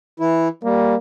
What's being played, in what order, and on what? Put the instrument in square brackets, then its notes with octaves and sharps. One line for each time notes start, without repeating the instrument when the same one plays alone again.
[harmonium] E3 E4
[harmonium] G3 [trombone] A#3